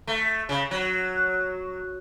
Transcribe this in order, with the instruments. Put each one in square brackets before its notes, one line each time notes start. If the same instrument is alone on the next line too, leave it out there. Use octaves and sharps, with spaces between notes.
[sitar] A3
C#3
F#3